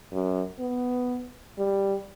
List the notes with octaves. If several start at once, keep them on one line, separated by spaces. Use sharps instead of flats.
F#2
B3
G3